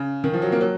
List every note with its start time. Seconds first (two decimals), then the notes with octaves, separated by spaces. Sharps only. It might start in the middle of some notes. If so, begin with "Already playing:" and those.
Already playing: C#3
0.24 D#3
0.33 F3
0.42 F#3
0.52 A#3
0.61 F#3